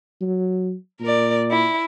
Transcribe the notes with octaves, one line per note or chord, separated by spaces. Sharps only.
F#3
A#2 A#4 D5
E4